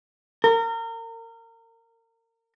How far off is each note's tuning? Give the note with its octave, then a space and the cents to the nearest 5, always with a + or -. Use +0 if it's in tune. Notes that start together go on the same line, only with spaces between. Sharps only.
A#4 -30